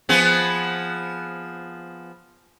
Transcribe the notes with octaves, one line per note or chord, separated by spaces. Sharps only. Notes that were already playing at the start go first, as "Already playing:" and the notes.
F3 B3 G#4